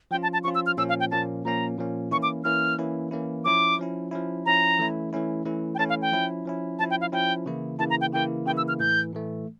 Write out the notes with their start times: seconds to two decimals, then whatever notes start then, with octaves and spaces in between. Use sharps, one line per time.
0.11 F3 C#4 F4 G5
0.23 A5
0.33 A5
0.44 F3 C#4 F4 C#6
0.55 E6
0.66 F6
0.77 A#2 F3 A#3 C#4 E6
0.89 F5
1.00 G5
1.11 A#2 F3 A#3 C#4 A5
1.45 A#2 F3 A#3 C#4 A#5
1.77 A#2 F3 A#3 C#4
2.11 E3 A#3 C#4 E4 C#6
2.23 D6
2.44 E3 A#3 C#4 E4 F6
2.78 E3 A#3 C#4 E4
3.11 E3 A#3 C#4 E4
3.45 F3 C#4 E4 D6
3.79 F3 C#4 E4
4.11 F3 C#4 E4
4.46 F3 C#4 E4 A#5
4.79 E3 A3 C#4 E4
5.13 E3 A3 C#4 E4
5.46 E3 A3 C#4 E4
5.75 G5
5.79 E3 A3 C#4 E4 A5
5.89 F5
6.02 G5
6.12 F3 C#4 E4
6.46 F3 C#4 E4
6.79 F3 C#4 E4 A5
6.91 G5
7.01 F5
7.12 F3 C#4 E4 G5
7.46 C#3 E3 A#3 E4
7.79 C#3 E3 A#3 E4 A5
7.90 A#5
8.01 G5
8.12 C#3 E3 A#3 E4 G5
8.46 C#3 E3 A#3 E4 G5
8.57 E6
8.68 F6
8.79 A2 E3 A3 G6
9.13 A2 E3 A3